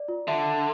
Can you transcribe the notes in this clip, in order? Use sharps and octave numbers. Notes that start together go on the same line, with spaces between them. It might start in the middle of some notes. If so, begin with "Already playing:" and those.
Already playing: D5
F4
D3 E5